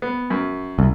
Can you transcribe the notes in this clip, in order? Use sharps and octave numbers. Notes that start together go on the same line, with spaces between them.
B3
F#2
C2